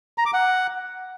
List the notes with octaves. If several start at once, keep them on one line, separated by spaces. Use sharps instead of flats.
A#5
D6
F#5